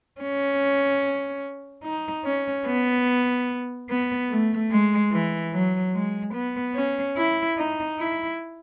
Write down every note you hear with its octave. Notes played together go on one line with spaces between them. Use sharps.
C#4
D#4
C#4
B3
B3
A3
G#3
E3
F#3
G#3
B3
C#4
E4
D#4
E4